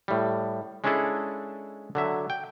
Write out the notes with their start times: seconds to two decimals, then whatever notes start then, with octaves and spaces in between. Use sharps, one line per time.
0.08 A2 G3
0.84 G#3 C#4 D4 E4 G#4 A4
1.95 D3 F#3 E5
2.30 G5